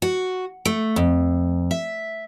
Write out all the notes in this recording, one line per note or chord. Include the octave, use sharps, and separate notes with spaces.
F#4
A3
F2
E5